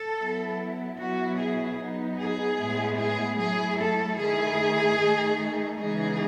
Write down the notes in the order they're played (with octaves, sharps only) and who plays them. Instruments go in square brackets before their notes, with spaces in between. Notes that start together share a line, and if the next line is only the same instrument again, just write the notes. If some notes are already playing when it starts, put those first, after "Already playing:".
Already playing: [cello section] A4
F#3 B3 E4
B2 F#3 B3 E4 F#4
G#4
F#3 B3 D#4
G#4
A2 G#3 B3 E4
G#4
F#3 A3 E4 G#4
A4
D#3 A3 E4 G#4
D#3 A3 D#4
C#3 E3 G#3 B3 D#4 G#4